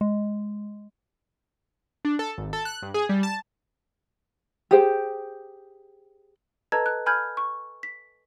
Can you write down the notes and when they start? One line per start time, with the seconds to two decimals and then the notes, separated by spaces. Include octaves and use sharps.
0.01 G#3
2.05 D4
2.19 A4
2.38 G#1
2.53 A4
2.65 F#6
2.82 G2
2.94 G#4
3.09 G3
3.23 A5
4.71 G4 G#4 C5 G5
6.72 A4 B4 D#5 A5 A#5 G#6
6.86 F#6
7.06 G#5 B5 F6 G6 G#6
7.37 C#6
7.83 B6